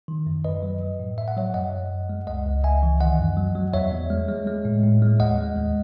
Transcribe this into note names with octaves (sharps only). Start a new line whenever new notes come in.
D#3
F#2
F#2 B4 D#5
F#3
F#3
A2
A2 E5
F#5
F#3 C#5 E5
F#2 D#5 F#5
F#2
F#2
G#3
C#2 D#5 F#5
C#2
C#2 E5 G#5
E3
D#3 D#5 F#5
F#2
F#3
F#3
E2 C#5 E5
E2
G#3
G#3
G#3
A2
A2
G#3
D#2 D#5 F#5
G#3
D#2